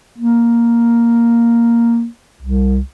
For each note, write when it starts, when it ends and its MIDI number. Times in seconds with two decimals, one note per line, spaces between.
0.18 2.06 58
2.42 2.78 36